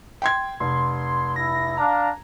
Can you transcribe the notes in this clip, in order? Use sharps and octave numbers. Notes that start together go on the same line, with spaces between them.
G5 C6 G#6
F1 C6
E4 A#6
D4 F5 A#5